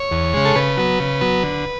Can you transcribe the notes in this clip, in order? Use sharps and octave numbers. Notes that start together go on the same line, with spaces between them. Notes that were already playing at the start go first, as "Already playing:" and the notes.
Already playing: C#5
E2
C#3 G#3
A4
C#3 B4
F#3 B3
C#3
F#3 B3
D3